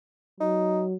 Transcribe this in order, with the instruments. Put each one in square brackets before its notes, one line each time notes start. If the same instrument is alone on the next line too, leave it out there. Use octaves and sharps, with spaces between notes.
[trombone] F#3 [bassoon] D#4